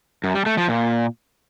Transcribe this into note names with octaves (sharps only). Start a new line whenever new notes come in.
F#2
G3
A3
F3
A#2